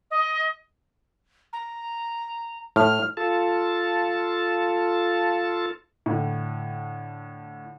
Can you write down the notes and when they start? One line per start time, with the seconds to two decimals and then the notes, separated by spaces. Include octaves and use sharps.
0.11 D#5
1.53 A#5
2.76 A2 F6
3.17 F4 A4 A5
6.06 A2 D3